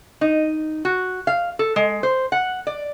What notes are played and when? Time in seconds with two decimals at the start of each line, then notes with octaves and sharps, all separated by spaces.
0.21 D#4
0.85 F#4
1.27 F5
1.59 A4
1.76 G#3
2.03 C5
2.32 F#5
2.67 D5